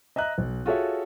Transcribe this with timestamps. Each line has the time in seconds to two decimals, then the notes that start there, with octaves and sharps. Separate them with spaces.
0.16 D#5 E5 A#5 F#6
0.38 B1
0.66 F4 F#4 G#4 A4 C#5 E5